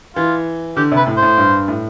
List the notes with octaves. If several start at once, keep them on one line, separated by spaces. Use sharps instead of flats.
E3 F4
D3 G4
C3 B4
A2
C5
A2
G2
A2